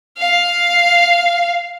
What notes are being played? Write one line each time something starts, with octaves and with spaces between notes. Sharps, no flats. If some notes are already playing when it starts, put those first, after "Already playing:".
F5